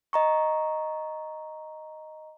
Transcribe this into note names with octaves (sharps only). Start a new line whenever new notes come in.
D#5 A#5 C#6